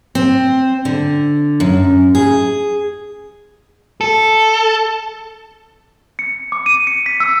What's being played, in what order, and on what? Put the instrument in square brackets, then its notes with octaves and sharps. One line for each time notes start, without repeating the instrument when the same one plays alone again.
[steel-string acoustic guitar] C4
D3
F#2
G#4
[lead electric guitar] A4
[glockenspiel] C#7
D6
D#7
C#7
B6
E6